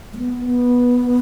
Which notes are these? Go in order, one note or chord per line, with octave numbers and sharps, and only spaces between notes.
G#3
B3
B3